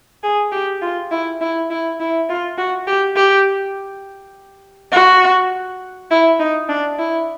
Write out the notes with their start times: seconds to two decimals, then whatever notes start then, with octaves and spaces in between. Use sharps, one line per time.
0.23 G#4
0.52 G4
0.82 F4
1.12 E4
1.41 E4
1.70 E4
2.00 E4
2.29 F4
2.58 F#4
2.87 G4
3.16 G4
4.93 F#4
6.11 E4
6.40 D#4
6.69 D4
6.99 E4